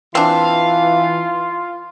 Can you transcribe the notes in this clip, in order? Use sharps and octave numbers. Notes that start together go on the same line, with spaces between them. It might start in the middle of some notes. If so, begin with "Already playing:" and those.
E3 C4 D4 F4 F5